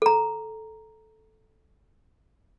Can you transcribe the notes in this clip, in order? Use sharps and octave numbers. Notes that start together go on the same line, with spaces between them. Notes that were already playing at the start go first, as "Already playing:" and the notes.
A4 A#5